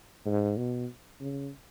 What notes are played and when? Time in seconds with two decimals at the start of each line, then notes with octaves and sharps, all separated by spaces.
0.26 G#2
0.57 B2
1.21 C#3